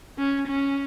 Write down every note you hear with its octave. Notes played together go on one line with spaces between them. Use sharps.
C#4
C#4